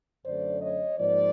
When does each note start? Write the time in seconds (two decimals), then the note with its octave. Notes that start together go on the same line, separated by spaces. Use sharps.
0.26 F#2 D3 F#3 A3 C5 D5
0.62 C#5 D#5
0.98 G#2 F3 A#3 C5 D5